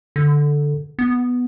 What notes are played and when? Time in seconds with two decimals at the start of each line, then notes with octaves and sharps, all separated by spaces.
0.16 D3
0.99 B3